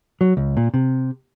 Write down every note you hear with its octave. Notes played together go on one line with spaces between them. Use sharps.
F#3
C#2
A#2
C3